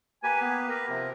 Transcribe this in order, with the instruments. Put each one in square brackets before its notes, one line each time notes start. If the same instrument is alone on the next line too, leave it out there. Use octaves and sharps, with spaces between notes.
[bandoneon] A#3 G4 B4 [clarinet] G#5
[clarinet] B3
A#4
[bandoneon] C3 F3 C4